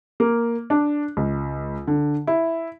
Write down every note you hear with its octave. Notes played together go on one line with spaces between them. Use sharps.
A#3
D4
C#2
D3
E4